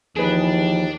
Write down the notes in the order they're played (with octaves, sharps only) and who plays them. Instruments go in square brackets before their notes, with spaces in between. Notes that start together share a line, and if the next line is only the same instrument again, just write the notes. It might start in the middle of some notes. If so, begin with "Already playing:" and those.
[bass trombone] D#2 [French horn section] E3 F3 [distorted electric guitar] D4 [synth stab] G#4 B4